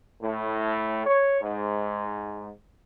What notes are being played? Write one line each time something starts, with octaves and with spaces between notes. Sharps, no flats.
A2
C#5
G#2